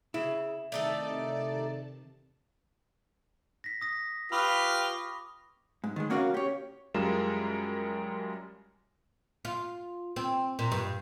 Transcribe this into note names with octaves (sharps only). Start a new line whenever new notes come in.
C#3 E4
C3 D#3 A3 D#4 A4 D5 A5
A#6 B6
D#6 A#6
F4 G4 B4 B5 C#6 D#6
D6
G#2
D#3 G#3
A#3 C#4 F#4 A#4 D#5 F5
G4 C#5
F#2 G3 G#3 F4 A#4 E7
F4
C4
A#2
G2